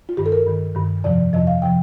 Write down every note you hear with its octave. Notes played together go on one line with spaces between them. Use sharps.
F4
G2 D#3 G4
A4
A#4
G2 D#3
G2 D#3
F2 C3 F3 D5
F2 C3 F3 D#5
F5
C3 F3 G5